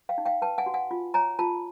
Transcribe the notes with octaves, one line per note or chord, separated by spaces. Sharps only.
F5 G5
D#4
F5 G5
B4 G5 A5
F#5 G#5
F#4
F#5 G#5
F4
C#5 G#5 A#5
F4 A5 B5